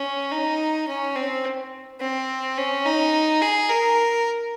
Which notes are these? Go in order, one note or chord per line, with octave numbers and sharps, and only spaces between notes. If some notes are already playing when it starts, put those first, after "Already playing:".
Already playing: C#4
D#4
C#4
C4
C4
C#4
D#4
G#4
A#4